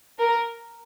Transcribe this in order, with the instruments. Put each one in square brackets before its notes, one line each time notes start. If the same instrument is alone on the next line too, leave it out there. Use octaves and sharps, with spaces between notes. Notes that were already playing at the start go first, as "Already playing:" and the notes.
[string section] A#4